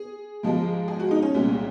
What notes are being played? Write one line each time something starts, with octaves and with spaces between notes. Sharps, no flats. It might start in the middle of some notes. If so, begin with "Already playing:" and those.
Already playing: G#4
G#2 F3 G#3
G#4
F#4
D#4
C#4
C2 A#2 G#3